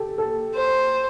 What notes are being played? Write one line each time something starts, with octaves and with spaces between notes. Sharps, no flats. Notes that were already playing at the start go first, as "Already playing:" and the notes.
Already playing: G4 A4
A4
C5